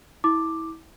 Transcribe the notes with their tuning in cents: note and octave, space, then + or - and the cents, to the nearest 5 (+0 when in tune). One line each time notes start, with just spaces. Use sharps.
E4 -25 D6 +5